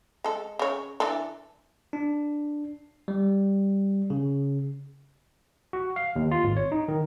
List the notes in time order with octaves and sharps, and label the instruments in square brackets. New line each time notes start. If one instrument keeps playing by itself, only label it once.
[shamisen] G#3 A4
C#3 C#5
E3 D4 A4
[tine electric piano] D4
G3
C#3
F#4
F5
D#2
F4
G#1
C#5
D#4
D#3